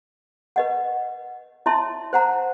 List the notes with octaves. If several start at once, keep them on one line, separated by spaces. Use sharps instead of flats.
B4 D#5 F#5
E4 C#5 E5 A5 C6
C5 F#5 A#5